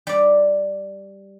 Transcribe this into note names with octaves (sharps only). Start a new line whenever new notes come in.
G3 D5